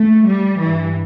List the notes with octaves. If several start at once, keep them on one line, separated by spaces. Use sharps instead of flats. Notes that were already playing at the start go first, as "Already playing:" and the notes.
Already playing: A3
G3
G2 E3